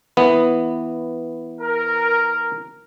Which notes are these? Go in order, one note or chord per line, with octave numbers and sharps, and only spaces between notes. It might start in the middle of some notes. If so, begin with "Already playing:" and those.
E3 B3
A#4